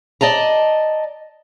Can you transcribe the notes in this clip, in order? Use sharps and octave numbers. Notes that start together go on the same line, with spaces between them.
D5 D#5 A5 A#5